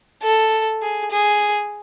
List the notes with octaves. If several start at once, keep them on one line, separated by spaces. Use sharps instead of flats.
A4
G#4
G#4